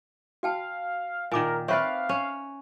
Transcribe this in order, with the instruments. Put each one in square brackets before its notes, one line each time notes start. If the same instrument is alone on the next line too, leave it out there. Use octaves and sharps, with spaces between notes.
[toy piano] F#4 G5 A5 [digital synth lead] F5
[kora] A#2 D#3 [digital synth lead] A#4 [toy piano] G#5 D6
[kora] C4 B4 D5 [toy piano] C#5 E5 C#6 [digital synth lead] F5
[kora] C#4